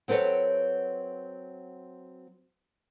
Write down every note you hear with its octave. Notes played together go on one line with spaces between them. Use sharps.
F#3 C4 A4 B4 C#5